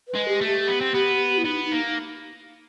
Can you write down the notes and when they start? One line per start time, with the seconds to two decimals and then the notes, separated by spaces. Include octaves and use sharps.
0.08 B4
0.15 G#3
0.28 G4
0.41 A3
0.48 G4
0.67 B3
0.81 C4
0.94 B3
1.38 E4
1.45 B3 D#4
1.65 D#4
1.72 A#3